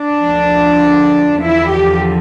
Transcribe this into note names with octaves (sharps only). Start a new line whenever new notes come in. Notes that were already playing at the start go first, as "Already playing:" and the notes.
Already playing: D4
D2 D3 F3
E2 D3 F3 E4
G4